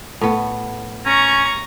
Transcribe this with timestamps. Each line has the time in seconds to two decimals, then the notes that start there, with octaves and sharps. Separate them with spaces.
0.21 A2 B3
1.06 C#4 A#5 C#6